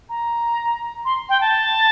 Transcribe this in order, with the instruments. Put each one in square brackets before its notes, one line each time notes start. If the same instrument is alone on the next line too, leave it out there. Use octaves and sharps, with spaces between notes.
[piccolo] A#5
C6
G5
A5